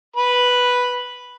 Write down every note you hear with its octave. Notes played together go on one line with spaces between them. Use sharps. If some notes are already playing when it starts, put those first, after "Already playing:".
B4 B5